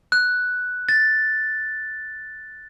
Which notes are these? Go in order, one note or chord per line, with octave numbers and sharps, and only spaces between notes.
F#6
A6